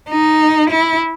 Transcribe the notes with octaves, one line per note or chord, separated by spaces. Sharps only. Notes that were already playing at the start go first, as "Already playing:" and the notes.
D#4
E4